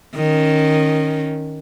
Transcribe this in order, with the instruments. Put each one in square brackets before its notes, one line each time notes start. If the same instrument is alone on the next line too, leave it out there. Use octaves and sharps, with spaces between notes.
[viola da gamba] D#3 C#4